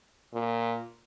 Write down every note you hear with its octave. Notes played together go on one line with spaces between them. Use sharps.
A#2